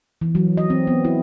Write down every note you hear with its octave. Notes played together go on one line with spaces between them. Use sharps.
E3
F#3
D#5
C4
B3
E4